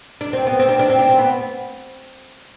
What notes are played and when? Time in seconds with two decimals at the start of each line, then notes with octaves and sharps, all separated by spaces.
0.21 D4
0.33 C4
0.47 B3
0.59 C4
0.69 D4
0.79 D4
0.90 C4
0.99 D4
1.09 C4
1.18 B3